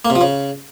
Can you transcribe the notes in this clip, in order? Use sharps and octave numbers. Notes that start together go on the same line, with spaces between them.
A#3
C3
F3
C#3